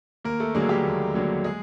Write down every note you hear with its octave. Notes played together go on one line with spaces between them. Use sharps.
D#2 A#3 A#4
A3 A4
D3 F#3 G#3 A#3 G#4
G3 G4
D#2
D3 F#3 A#3
G#3 G#4